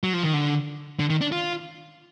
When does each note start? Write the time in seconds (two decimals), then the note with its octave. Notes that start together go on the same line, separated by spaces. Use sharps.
0.04 F#3
0.14 F3
0.24 D#3
0.34 D3
0.99 D3
1.10 D#3
1.21 D4
1.32 F4